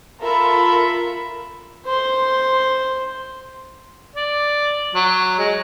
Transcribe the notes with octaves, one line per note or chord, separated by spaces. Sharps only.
F4 A4 A#4 E5 B5
C5 C6
D5
F#3
G#3